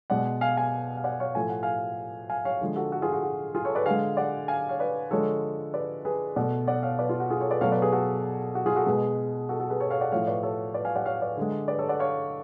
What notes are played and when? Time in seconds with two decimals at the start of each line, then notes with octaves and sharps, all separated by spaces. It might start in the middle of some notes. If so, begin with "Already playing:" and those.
0.10 B2 G#3 D5 F#5
0.41 F5 G#5
0.57 F5 G#5
0.97 F5
1.04 D5 F#5
1.20 C#5 F5
1.35 A2 F3 A3 G#5
1.49 F#5
1.63 F5 G#5
2.30 F5 G#5
2.45 C#5 F5
2.61 D3 F3 G#3
2.76 F#4 A4
2.92 F#4 A4
3.02 F4 G#4
3.13 F#4
3.23 F#4
3.55 F4 G#4
3.65 A4 C#5
3.75 B4 D5
3.86 D3 G#3 F5 G#5
4.17 D5 F#5
4.48 F5 G#5
4.69 C#5 F5
4.80 B4 D5
5.11 D3 F3 G#3 A4 C#5
5.74 B4 D5
6.05 G#4 B4
6.36 B2 A3 D5 F#5
6.67 D5 F#5
6.83 C#5 F5
6.99 B4 D5
7.09 F4
7.20 F#4
7.30 F4 G#4
7.41 A4 C#5
7.51 B4 D5
7.61 B2 F#3 A3 C#5 F5
7.72 B4 D5
7.82 G#4 B4
7.92 F#4 A4
8.55 F#4
8.66 F4 G#4
8.76 F#4 A4
8.86 B2 G#3 G#4 B4
9.49 F#4 A4
9.60 F#4 A4
9.70 G#4 B4
9.80 A4 C#5
9.91 C#5 F5
10.01 D5 F#5
10.12 A2 F3 A3 C#5 F5
10.27 B4 D5
10.43 A4 C#5
10.74 B4 D5
10.85 F5 G#5
10.95 D5 F#5
11.06 C#5 F5
11.21 B4 D5
11.37 D3 G#3
11.68 B4 D5
11.79 A4 C#5
11.89 D5 F#5
11.99 C#5 F5